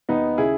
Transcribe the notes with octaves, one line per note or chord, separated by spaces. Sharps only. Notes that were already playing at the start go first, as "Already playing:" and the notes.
D#2 B3 D#4
C#3 E4 G#4